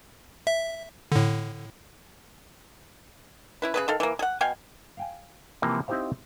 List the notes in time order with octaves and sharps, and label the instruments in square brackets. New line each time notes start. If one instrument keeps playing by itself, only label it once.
[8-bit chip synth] E5
A2 D3
[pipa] C#4 E4 B4
C#3 G#4 B4
D#3 A4 F5
E3 A#3
G#4 F#5
B2 F5 G5 G#5
[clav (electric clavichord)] F5 G5 G#5
C3 E3 F3 A#3
C4 D#4 E4 G4 C5 F5